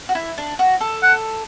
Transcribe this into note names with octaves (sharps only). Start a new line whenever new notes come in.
F#4
E4
D4
F#4
A4
F#5